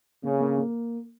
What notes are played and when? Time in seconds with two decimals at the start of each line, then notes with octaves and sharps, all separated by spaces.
0.23 C#3 A#3
0.40 A#3
0.58 A#3